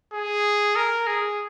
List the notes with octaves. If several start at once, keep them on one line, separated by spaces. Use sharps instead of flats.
G#4
A#4
G#4